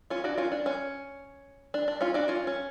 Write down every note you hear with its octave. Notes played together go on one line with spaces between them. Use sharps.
C#4 F4
D4 F#4
C#4 F4
D4
C#4
D4
D4
C#4 F4
D4 F#4
C#4 F4
C#4